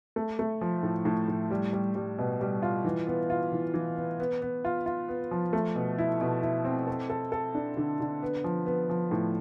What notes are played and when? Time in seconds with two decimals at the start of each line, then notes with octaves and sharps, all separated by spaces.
0.16 A3
0.39 A3
0.61 F3
0.83 A2
1.05 A2
1.28 A2
1.50 G3
1.73 G3
1.95 G3
2.18 B2
2.41 G3
2.62 F4
2.85 E3
3.07 B3
3.30 F4
3.52 E3
3.74 E3
3.96 B3
4.20 B3
4.42 B3
4.65 F4
4.86 F4
5.08 B3
5.31 F3
5.53 A3
5.75 B2
5.98 E4
6.21 B2
6.42 E4
6.65 C4
6.87 A4
7.10 A4
7.32 A4
7.55 D4
7.77 D3
8.00 D3
8.23 B3
8.44 F3
8.66 B3
8.89 F3
9.11 A2